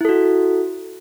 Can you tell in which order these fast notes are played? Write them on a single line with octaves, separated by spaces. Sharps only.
E4 A4 F#4